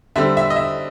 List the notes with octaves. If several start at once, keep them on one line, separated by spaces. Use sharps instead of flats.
D3 G3 C4 E5
E5
D#5
E5